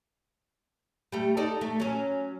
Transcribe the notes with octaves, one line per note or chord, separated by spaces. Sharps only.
G3 A3
D#4 A4 D5
A3
F#3 C#4